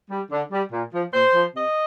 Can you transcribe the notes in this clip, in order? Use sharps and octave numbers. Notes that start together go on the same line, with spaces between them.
G3
D3
G3
A#2
F3
A#2 C5
F3
C3 D#5